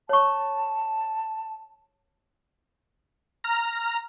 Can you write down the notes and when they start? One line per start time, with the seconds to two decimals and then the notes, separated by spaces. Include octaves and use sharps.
0.09 C#5 A5 C#6
3.44 A#5 F6